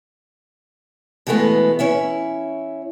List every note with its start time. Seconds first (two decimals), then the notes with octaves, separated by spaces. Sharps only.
1.27 B2 E3 G#3 A3 B3
1.79 C#4 E4 E5